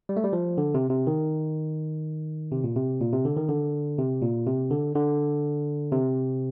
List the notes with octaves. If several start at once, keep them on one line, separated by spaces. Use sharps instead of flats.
G3
A3
G3
F3
D3
C3
C3
D#3
C3
A#2
C3
A#2
C3
D3
D#3
D3
C3
A#2
C3
D3
D3
C3